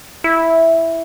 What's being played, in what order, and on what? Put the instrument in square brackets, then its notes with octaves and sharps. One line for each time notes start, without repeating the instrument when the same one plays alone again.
[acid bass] E4